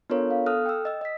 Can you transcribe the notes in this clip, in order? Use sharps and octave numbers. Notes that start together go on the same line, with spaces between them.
B3 D4 F4 A4 A#4 C#5
B3 F5
A4 D#6 F6 F#6
G5 E6
D#5 E6
D#5 B6